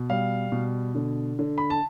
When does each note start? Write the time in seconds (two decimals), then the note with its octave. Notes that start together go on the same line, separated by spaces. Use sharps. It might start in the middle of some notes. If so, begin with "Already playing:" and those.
Already playing: B2
0.09 G3 F5
0.52 B2
0.95 D3
1.39 D3
1.58 B5
1.70 A5